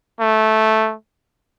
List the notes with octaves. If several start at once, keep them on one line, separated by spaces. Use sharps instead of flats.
A3